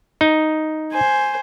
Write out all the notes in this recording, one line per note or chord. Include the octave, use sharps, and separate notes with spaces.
D#4
C5 G#5